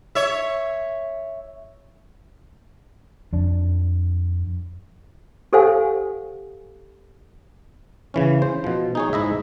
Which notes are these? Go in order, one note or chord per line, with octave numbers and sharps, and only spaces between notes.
C#5 E5
F2 D4
G4 A4 C5 F5 F#5 G#5
C#3 E3 C#4
C5
B2 F3
D#4 G#4 C#5
G#2 E4 D#5 E5